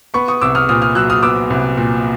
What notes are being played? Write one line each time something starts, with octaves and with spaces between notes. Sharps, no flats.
B3 B5 C#6
C#6 D#6
C2 D6 E6
D#6 F6
A#2 D#6 F6
D#6 F6
F#3 E6 F#6
D#6 F6
B3 D6 E6
C2
A#2